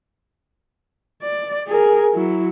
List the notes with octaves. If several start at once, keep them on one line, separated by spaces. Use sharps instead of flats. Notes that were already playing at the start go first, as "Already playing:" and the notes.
D5
G#4 A#4
F#3 E4